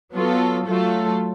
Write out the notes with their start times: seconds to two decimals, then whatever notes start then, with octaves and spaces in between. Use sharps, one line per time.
0.13 F#3 B3 F4 A4
0.66 F#3 A3 F4 A4